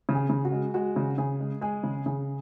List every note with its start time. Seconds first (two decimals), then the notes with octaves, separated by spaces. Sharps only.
0.09 C#3
0.15 G#4
0.30 C#3
0.45 F#4
0.52 G#3
0.74 G#3 F#4
0.96 C#3
1.18 C#3 G#4
1.40 G#3
1.61 G#3 G#4
1.83 C#3
2.06 C#3 G#4